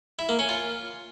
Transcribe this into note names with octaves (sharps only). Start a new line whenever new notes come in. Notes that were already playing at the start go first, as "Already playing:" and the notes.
E4
A#3
C#4
F4